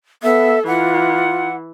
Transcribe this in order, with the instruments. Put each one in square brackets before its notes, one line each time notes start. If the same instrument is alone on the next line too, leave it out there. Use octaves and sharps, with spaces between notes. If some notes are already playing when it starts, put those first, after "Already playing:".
[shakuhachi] B3 [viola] A4 [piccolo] E5
[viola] E3 [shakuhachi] F4 [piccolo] F#5